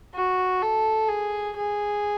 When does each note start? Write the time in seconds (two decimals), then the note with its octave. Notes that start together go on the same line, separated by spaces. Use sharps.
0.15 F#4
0.62 A4
1.09 G#4
1.56 G#4